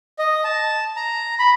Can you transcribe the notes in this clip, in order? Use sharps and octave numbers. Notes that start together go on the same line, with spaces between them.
D#5
A5
A#5
B5